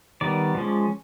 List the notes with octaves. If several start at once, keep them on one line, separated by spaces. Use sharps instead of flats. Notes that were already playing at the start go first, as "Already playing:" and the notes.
D#3 G3 B3 D5
F3 G#3 C#4